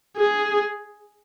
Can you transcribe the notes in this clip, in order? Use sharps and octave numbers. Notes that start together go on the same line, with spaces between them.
G#4